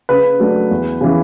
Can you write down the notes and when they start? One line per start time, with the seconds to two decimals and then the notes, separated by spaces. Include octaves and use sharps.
0.09 C#3 B4
0.39 F#3 A3 D4
0.71 E2
1.01 C#3 E3